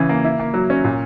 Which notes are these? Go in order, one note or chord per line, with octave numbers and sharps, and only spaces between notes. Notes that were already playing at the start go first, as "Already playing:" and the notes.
Already playing: C#3 E3
A#3
E4
A#3
F#3
C#4
A#2